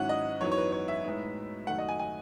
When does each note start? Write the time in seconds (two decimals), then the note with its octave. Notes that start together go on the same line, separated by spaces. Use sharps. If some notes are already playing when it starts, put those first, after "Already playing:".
Already playing: G#2 D#3 F#3 C#4 E4 F#5
0.09 D#5
0.41 F#2 E3 B3 D#4 C#5
0.52 C#5
0.58 B4
0.72 C#5
0.88 E5
1.04 A2 G#3 B3 D#4
1.67 F#2 D#3 A3 F#5
1.78 D#5
1.89 G#5
1.99 G#5